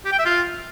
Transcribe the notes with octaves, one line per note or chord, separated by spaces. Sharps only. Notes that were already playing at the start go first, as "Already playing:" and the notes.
G4
G5
E5
F4